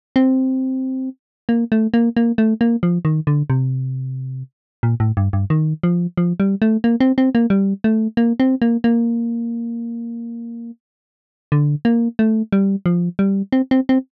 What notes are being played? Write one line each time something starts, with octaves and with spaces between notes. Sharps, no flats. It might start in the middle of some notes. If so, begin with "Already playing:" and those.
C4
A#3
A3
A#3
A#3
A3
A#3
F3
D#3
D3
C3
A#2
A2
G2
G2
D#3
F3
F3
G3
A3
A#3
C4
C4
A#3
G3
A3
A#3
C4
A#3
A#3
D3
A#3
A3
G3
F3
G3
C4
C4
C4